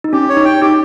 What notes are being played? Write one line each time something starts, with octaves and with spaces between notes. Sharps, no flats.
D#4
C#4 G4
C#5
D#4
G5
D#4 G4